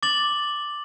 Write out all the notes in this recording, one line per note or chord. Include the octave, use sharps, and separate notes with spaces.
D6 A6 F#7